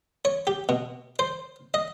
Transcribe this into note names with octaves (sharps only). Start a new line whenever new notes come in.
C#5
G4
B2
C5
D#5